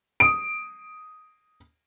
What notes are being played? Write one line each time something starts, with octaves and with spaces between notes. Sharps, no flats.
D#6 D7